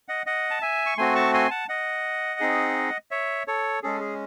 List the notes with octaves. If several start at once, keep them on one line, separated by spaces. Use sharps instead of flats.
D#5 F#5
D#5 F#5
A5
E5 G#5
C#6
A3 C4 F#4 G#5 C6
A5 C#6
G#5 C6
F#5 A5
D#5 F#5
C4 D#4 G#4
C#5 E5
A4 C#5
G#3 C#4 G#4 A4
G#4